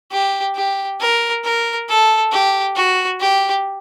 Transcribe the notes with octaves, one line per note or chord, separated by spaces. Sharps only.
G4
G4
A#4
A#4
A4
G4
F#4
G4